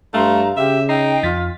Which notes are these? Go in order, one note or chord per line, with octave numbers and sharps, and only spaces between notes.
G2 A3 F5 A#5 C6
C#3 G4 E5
D#4 G5 A#5 C7
F2 F4 A6 B6